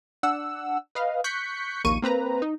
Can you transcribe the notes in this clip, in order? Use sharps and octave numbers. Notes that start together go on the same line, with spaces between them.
D4 F#5 E6
B4 D#5 F5
C#6 F#6 G6 B6 C#7
A#1 D#2 A#3 C#6 D#7
A#3 C4 B4 A#5
D#4